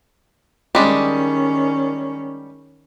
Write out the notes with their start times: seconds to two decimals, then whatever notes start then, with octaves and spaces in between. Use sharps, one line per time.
0.75 D#3 G3 G#3 C#4 D4